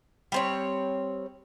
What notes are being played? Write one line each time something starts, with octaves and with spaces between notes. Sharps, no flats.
G3 C4 C#5